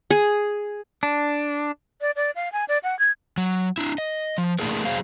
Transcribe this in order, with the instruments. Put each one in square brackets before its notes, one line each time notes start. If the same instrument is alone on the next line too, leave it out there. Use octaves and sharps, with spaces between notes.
[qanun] G#4
[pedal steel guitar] D4
[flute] D5
D5
F5
G#5
D5
F#5
G#6
[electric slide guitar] F#3
D4 E4
D#5
F3
A3 A#3 D4 E4 G#4 A#4
F#3 G#4 C5 F5